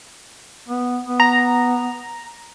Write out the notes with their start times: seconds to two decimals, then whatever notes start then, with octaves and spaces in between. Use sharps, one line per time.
0.68 B3
1.05 B3
1.20 A#5